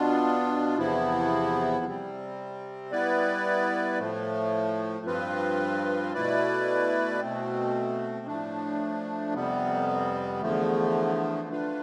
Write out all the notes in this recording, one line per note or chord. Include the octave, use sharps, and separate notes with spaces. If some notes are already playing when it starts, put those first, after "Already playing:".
Already playing: B2 B3 D4 F4
E2 C3 F3 B3 E4
C3 G3 C4
G3 B3 E4 B4 D5
A2 F3 A3
G2 F3 C4 F4 B4
B2 A3 E4 B4 D5
B2 A3 C4
A2 F3 A3 D4
F2 C3 G3 B3
E2 D3 F3 A3
D3 A3 D4 F4 B4